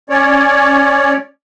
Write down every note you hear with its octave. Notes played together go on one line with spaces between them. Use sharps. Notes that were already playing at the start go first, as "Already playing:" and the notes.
C#4 C#5 D5